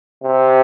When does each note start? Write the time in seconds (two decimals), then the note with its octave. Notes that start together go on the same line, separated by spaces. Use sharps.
0.24 C3